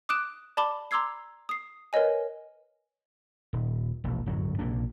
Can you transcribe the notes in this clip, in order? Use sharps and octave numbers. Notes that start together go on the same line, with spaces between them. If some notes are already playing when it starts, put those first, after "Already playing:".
D6 D#6 F#6 D7 E7
D5 A5 B5 D6 G7
A#5 C6 D6 E6 G#6 C7
D#6 C7
A#4 B4 C#5 D#5 G#5
D#1
E1 A#1
D1 G1 F#2 F#3
A#1 C3 A#3 D4